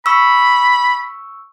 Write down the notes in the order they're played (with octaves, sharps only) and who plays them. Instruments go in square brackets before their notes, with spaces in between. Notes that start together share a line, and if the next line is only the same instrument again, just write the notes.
[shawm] B5 [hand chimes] C#6 E6